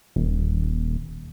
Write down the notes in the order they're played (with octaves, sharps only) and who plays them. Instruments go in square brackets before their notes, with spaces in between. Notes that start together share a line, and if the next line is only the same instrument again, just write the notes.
[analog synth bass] D#1